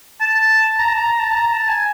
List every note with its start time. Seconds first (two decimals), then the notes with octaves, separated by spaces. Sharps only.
0.21 A5
0.79 A#5
0.88 A5
0.97 A#5
1.20 A5
1.31 A5
1.36 A#5
1.53 A5
1.69 G#5